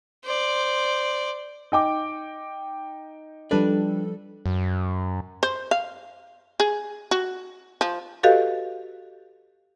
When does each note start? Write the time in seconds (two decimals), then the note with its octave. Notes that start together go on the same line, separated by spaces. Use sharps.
0.24 C5 D5
1.72 D#4 G5 D6
3.51 F3 G3 D4 A4 B4
4.46 F#2
5.43 C5
5.71 F5
6.60 G#4
7.11 F#4
7.81 F3
8.23 F#4 G4 A4 B4 D#5 F5